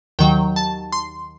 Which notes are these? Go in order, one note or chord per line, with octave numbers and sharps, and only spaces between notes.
D#2 D#3 F#3 G5
A5
C6